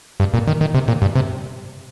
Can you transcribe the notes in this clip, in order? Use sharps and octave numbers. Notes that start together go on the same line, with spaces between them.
G2
A#2
D#3
D#3
C3
A#2
G2
C3